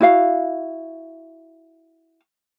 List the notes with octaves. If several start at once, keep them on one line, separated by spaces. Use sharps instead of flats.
E4 F#4 F5